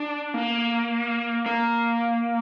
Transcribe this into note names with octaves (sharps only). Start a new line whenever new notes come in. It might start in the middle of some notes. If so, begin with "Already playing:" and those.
Already playing: D4
A#3
A#3